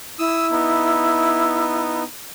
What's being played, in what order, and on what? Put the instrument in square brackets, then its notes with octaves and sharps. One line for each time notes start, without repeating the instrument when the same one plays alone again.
[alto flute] E4 [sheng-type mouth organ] D#6 E6
[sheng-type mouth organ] B3 D#4